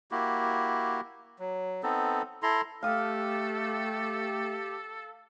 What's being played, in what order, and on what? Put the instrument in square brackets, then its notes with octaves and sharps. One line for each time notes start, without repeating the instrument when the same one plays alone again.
[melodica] A#3 E4 F#4 G4
F#3
B3 C4 D#4 A4
E4 A4 A#5 C6
[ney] A3 [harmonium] G4 [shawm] A4 [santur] F5 D#6